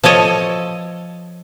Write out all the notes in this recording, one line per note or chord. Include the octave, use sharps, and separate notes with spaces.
F3 A4 C#5 D#5